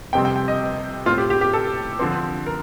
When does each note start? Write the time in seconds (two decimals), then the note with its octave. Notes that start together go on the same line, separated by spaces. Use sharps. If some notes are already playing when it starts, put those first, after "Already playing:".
0.13 F2 C3 G3 C4 G5
0.25 G5
0.36 G5
0.48 D#5
1.06 A2 A3 C4 F4
1.18 G4
1.30 G4
1.41 G4
1.53 A4
1.99 D3 F3 C4
2.46 A#4